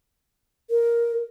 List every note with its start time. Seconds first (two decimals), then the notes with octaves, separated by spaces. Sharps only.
0.70 A#4